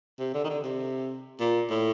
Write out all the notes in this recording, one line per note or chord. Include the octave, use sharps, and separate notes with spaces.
C3
D3
D#3
D3
C3
A#2
A2